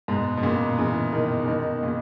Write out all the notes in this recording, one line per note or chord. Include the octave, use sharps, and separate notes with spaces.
G#2 B2
B2
A#2 C#3
C#3 E3
B2 D#3
C#3
B2 D#3
A#2 C#3